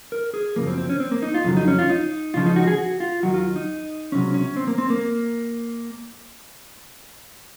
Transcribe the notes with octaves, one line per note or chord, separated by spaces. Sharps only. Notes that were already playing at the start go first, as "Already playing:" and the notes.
A#4
G#4
F#2 C#3 F3 A#3
C4
C4
C#4
C4
A#3
D#4
F4
F2 C#3 F#3
D#4
C#4
F4
D#4
C#2 C#3 F3 F4
D#4
F#4
G#4
F#4
F4
D#2 D#3 F#3 F#4
F4
D#4
C#2 C3 F#3 C#4
C#4
C4
A#3
C4
A#3